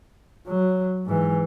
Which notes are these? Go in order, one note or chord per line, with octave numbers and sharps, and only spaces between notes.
F#3
G#2 E3